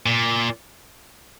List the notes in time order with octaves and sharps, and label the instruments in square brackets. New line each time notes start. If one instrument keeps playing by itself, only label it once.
[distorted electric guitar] A#2